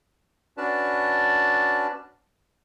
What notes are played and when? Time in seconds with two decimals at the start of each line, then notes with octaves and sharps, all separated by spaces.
0.57 C#4 D4 F#4 B4 D5 A5